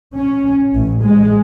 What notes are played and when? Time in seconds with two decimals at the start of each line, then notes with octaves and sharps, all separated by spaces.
0.15 C#4
0.74 A1
1.03 G#3